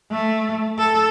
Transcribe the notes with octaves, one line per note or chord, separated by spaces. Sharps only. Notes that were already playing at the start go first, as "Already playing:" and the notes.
A3
A4